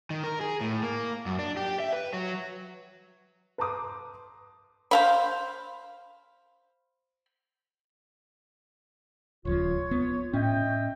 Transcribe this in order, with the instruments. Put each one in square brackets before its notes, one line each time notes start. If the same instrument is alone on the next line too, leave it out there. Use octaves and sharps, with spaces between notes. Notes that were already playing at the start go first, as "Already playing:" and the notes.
[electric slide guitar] D#3
A#4
G#4
A2
A#3
F#2
D4
G4
E5
B4
F#3
[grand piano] B4 A5 A#5 C6 D6 D#6
[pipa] C5 F5 B5
[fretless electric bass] D#1 C#2 F3 [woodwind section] F4 C#5
[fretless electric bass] B3
[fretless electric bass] A2 C#4 [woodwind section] D#5 E5 G5